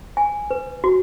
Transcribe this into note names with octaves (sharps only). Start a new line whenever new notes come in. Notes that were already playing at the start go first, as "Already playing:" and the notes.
G#5
B4
F#4